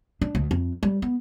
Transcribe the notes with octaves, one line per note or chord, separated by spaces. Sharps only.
D4
D2
F2
G3
B3